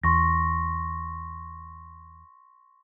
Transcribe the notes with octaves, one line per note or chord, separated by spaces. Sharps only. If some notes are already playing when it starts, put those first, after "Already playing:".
E2 C6 C#6 A#6